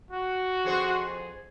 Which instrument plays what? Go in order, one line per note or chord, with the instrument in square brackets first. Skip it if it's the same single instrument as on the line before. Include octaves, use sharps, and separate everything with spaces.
[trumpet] F#4
[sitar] F2 G#4 C5